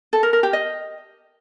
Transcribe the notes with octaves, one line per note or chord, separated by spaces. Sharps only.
A4
A#4
A#4
G4
D#5